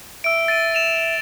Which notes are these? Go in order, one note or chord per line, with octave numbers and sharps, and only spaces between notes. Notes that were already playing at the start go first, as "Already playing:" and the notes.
E5 E6 D7
A6 D7 D#7
E7 F7